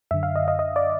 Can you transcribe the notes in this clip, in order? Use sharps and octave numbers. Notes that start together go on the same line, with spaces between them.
F#2 D3 E5
F5
D#5
D#5
D#5
D5